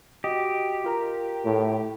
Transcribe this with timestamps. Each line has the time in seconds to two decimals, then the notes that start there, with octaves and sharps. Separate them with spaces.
0.24 F#4 G4 D#5
0.84 F4 A#4 A#5
1.45 A2